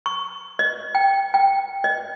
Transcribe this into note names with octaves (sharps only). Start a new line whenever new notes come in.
C#6
D#5
G5
G5
D#5